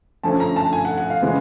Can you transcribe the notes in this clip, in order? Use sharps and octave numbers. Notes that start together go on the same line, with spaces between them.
D3 F3 A3 C#4 A5
A#5
A5
G#5
F#5
F#5
F5
C#3 E3 G#3 B3